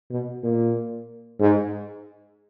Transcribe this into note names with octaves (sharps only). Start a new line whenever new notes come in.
B2
A#2
G#2